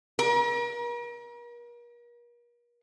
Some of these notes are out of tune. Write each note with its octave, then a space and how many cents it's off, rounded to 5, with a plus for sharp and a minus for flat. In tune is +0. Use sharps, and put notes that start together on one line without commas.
A#4 +40